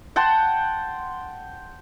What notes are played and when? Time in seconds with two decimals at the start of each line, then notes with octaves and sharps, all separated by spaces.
0.16 F#5 G5 A5 C6